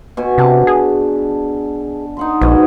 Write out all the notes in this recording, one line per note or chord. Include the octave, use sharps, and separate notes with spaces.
B2 G#5 C#6
C3 D4 A5
G#4
D#4 F#5 C6
A#1 G#2 B2 D#5